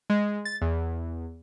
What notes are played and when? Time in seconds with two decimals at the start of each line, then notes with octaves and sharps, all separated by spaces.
0.10 G#3
0.45 A6
0.62 E2